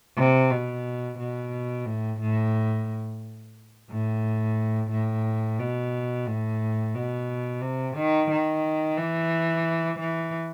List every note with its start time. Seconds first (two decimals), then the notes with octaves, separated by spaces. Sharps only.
0.17 C3
0.50 B2
1.19 B2
1.86 A2
2.20 A2
3.90 A2
4.91 A2
5.59 B2
6.27 A2
6.95 B2
7.62 C3
7.96 D#3
8.31 D#3
8.97 E3
10.00 E3